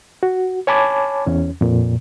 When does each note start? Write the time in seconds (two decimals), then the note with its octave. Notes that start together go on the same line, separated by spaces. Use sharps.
0.23 F#4
0.67 C#5 G#5 A5 B5 D6 G#6
1.27 E2 C#4
1.61 F2 A#2